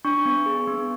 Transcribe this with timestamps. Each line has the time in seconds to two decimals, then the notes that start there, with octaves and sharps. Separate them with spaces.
0.05 D4 C#6
0.25 B3
0.46 G#4
0.67 B3